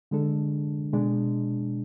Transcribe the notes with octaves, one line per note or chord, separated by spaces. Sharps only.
D3 G#3 D4 A4
B2 G#3 D4